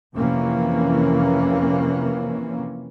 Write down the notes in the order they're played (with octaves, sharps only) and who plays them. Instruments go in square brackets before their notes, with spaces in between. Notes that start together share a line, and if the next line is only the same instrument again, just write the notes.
[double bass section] F2 C3 E3 A#3 C#4